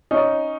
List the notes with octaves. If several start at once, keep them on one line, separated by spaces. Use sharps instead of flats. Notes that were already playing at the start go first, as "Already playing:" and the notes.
C#4 D#4